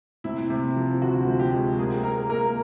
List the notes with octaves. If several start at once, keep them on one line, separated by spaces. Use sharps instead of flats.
C3 E4
C3
F3
D2 F#4
F3
G4
G#3
A#3 G#4
A#3 A#4
A#3 A#4